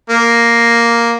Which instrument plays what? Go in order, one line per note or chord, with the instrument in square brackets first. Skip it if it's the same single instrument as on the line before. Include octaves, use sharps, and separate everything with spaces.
[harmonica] A#3